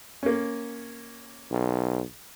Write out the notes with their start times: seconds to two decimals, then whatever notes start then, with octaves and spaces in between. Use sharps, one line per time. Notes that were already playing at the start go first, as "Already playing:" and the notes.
0.23 A#3 C#4
1.51 B1